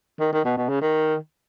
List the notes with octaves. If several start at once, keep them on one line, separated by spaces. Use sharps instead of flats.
D#3
D#3
B2
B2
C#3
D#3